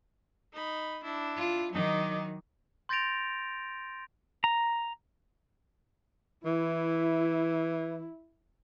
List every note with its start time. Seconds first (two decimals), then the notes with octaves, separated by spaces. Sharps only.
0.54 D#4 B5
1.03 D4 E4
1.37 F4
1.73 D#3 F#3 D#4 D6
2.89 C6 G6 A6 A#6 D7 F7
4.44 A#5
6.45 E3 E4